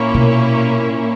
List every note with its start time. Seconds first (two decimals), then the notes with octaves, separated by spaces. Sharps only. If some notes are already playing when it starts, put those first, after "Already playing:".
Already playing: A#2 A#3 C#4 E4
0.14 B2